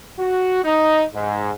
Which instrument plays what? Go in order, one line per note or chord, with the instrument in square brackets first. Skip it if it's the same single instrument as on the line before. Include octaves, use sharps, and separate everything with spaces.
[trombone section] F#4
D#4
G#2